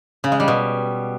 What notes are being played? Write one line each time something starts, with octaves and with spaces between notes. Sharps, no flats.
C#3
G#3
G3
B2